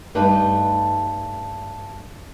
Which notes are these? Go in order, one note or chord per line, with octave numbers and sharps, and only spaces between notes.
G2 G3 A3 D#4 B4